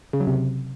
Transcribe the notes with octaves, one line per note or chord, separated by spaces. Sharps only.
C#3
F#3
C3